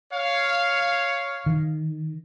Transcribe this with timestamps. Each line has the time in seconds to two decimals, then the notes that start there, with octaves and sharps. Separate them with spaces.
0.13 C#5 F5
1.46 D#3